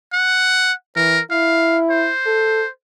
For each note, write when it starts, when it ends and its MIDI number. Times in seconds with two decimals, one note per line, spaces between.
0.13 0.73 78
0.96 1.19 52
0.96 1.21 70
1.31 2.10 64
1.31 1.78 77
1.90 2.69 72
2.26 2.64 69